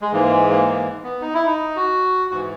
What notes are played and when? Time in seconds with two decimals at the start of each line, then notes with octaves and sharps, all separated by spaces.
0.02 G#3
0.12 G#2 E3 A#3
0.31 G#3
0.49 A#3
0.66 A#3
1.04 B3
1.21 D#4
1.34 E4
1.46 D#4
1.76 F#4
2.30 G#2 E3 F#4